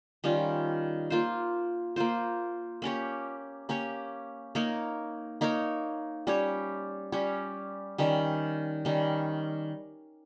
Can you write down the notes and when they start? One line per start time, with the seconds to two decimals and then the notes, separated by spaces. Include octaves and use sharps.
0.24 D#3 G3 C#4 F4
1.10 A#3 F4 C5
1.96 A#3 F4 C5
2.82 A#3 C#4 G4 C#5
3.69 A#3 C#4 G4 C#5
4.55 A#3 D#4 A#4 C#5
5.41 A#3 D#4 A#4 C#5
6.27 G3 C#4 G4 C#5
7.12 G3 C#4 G4 C#5
7.98 D#3 G3 C#4
8.85 D#3 G3 C#4